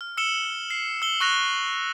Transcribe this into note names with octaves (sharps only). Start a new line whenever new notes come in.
F6
E6 C#7 E7 G7
C7
E6 G7
C#6 F#6 A#6 F7